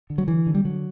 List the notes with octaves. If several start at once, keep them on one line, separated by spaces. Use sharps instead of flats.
D3
F#3
D3 E3
D3
G3
D3 F#3